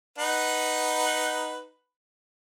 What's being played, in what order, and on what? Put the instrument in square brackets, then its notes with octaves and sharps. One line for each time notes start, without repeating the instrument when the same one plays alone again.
[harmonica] D#4 B4 F#5